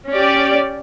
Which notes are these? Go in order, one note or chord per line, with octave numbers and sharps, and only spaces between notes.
C#4 G4 D5